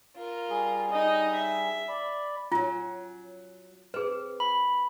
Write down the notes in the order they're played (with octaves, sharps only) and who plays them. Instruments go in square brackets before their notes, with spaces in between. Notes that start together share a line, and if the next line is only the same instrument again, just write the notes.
[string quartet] F4 A#4
[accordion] G3 G#4
[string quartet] D#4 D#5
E5
[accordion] D5 B5
[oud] F#3 C#4 [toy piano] F4
[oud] C4 [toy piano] G#4 B4
[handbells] B5